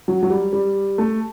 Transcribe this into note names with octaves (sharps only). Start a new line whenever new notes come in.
F#3
F#3
G3
G3
A3